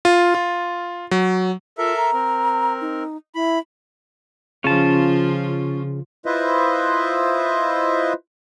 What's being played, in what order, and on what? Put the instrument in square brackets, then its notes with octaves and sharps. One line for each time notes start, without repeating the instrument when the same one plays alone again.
[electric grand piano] F4
F4
F#3
[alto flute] F4 [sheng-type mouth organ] A4 A#4 E5
[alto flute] A#5
[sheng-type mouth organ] C4 A#4
[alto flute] D#4
[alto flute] E4 [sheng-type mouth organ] B5
[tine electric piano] C#3 [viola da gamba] F3 F4 [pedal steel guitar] C#4 A5
[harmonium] E4 F4 B4 C5 D#5 E5